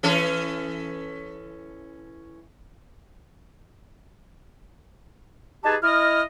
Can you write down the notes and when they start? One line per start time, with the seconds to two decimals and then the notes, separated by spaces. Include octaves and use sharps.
0.03 E3 C#4 A4
5.64 D#4 G4 G#4 B4 G#5 A5
5.83 E4 D#5 F6